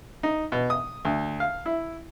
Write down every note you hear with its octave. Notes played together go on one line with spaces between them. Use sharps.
D#4
B2
D#6
D2
F5
E4